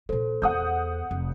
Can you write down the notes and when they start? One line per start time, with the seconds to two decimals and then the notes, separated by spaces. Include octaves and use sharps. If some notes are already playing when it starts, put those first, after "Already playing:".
0.09 A#2 A#3 A4 C5
0.42 E2 B3 F#5 D#6 G6
1.11 F1